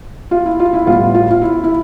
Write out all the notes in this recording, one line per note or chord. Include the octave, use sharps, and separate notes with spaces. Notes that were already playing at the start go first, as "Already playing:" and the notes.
F4
E4
F4
E4
A2 G3 B3 F4
F4
F4
E4
E4